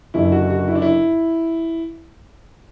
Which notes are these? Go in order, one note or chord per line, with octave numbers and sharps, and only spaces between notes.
F#1 F#2 D3 E4
F#4
F#4
E4
D4
E4